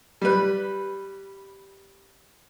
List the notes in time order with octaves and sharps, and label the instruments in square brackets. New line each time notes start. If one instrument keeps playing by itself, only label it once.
[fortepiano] G3 B4